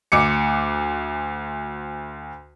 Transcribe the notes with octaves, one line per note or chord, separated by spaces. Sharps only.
D2 D6 C#7